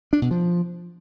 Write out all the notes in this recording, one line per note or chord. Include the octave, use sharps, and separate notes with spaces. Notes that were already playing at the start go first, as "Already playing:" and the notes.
D4
B2
F3